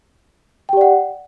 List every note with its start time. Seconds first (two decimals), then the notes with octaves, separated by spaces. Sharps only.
0.69 G5
0.73 G4
0.77 D5
0.81 F#5